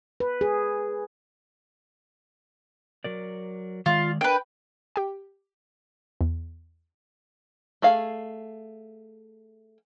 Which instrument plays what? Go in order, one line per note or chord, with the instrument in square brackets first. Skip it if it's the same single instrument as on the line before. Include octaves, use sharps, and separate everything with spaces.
[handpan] B4
G#4
[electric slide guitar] F#3 A#4 D5
[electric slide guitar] D#3 G#3 D5 [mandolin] F4
[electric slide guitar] D4 A#4 [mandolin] B4 G5
[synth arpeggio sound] G4 G5
E2
[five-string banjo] A3 G#4 F5